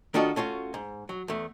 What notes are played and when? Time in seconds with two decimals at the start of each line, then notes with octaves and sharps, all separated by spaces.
0.14 D#3 D4 F4 F#4 A4 D#5
0.36 A3 C#4 F4 F#4
0.74 G#2
1.09 F#3
1.28 E2 A3